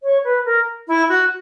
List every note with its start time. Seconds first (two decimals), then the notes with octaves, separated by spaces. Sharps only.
0.03 C#5
0.24 B4
0.45 A#4
0.88 E4
1.09 F#4